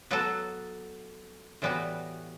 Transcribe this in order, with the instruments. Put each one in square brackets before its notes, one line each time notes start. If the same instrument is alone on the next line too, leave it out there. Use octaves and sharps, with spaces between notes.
[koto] F#3 B3 F#4 A4
A2 E3 G3 B3 F#4